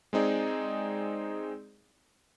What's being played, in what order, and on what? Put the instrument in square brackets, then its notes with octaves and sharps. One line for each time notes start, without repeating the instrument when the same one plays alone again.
[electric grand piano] G#3 C4 D#4 G#4 D5